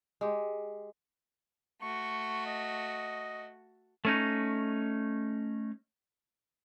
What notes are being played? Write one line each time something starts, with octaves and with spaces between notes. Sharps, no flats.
G#3 G4
A3 F#4 C#6
D#5
A3 C#4 D#4